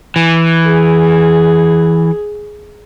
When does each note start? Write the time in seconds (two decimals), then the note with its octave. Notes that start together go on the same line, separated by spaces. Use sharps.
0.16 E3
0.65 G#4